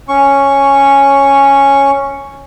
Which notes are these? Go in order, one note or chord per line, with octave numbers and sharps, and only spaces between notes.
C#4 C#6